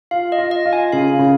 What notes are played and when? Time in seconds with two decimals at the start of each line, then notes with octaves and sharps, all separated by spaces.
0.11 F4 F5
0.32 D#5
0.38 F4
0.51 D#5
0.66 F4
0.73 G#5
0.93 C#3 F5
1.19 C#3